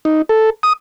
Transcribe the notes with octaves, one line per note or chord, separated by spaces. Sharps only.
D#4
A4
D#6